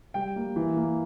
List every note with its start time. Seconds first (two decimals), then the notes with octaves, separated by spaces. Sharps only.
0.14 G3 G5
0.36 A#3
0.56 E3
0.77 A#3